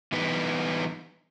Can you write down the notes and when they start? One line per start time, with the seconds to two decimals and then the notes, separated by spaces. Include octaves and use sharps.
0.12 E3 G3 B3 D#4 B4